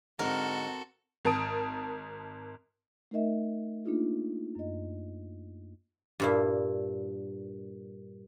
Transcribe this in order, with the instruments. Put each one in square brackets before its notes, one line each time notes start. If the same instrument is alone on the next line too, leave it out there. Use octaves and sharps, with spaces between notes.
[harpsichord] G#2 D3 [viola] C4 [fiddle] F#4 A4 [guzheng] A#4
[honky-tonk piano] G#1 A#4 A5 D#6 D7
[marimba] A3 D#4 A#4 D#5 E5
A#3 D4 D#4 F4 G#4
F#2 D#5
[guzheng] G2 A#2 E4